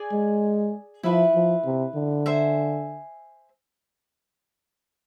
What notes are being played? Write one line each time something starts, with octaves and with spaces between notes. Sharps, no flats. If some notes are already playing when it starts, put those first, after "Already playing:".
Already playing: G#4 D5 G#5
G#3
F3 E4 B4 E5
F3
C3
D3
C5 E5 G#5